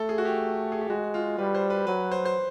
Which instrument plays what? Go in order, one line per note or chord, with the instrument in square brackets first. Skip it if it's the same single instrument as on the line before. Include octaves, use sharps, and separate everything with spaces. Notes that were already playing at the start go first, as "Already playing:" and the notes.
Already playing: [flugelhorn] A3 [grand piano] A4
[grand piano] G#4
F#4
G4
G#4
G4
[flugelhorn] G#3 [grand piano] F#4
[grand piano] F4
[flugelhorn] G3 [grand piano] B4
[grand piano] C5
B4
[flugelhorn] F#3 [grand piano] B4
[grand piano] C5
C5